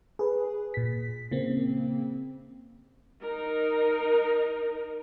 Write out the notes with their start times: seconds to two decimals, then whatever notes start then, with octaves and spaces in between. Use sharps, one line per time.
0.19 G#4 B4
0.74 A#2 B6
1.31 C#3 A#3 C4
3.22 D#4 A#4